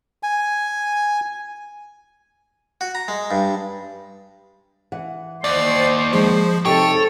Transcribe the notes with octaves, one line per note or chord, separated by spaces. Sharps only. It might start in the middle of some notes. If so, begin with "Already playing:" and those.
G#5
F#4
A#5
G#3
G2
E3 F#5
D#2 C5 D5
F3 G#3
C3 D#4 G4 A4 C#5 G5